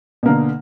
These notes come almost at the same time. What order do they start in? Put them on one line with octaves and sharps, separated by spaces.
B2 A#3 D3